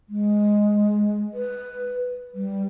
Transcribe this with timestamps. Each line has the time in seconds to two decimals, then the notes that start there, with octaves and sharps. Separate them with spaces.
0.09 G#3
1.34 B4
2.35 G3